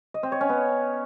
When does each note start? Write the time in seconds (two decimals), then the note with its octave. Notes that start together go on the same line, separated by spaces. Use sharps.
0.14 D#5
0.23 C4
0.32 C#5
0.41 C#4
0.49 B3